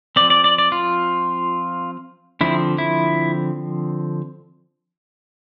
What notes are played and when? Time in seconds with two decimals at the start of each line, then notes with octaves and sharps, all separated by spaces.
0.16 F3 C4 D5
0.30 D5
0.44 D5
0.58 D5
0.72 F4
2.41 D3 F3 C4 E4
2.78 E4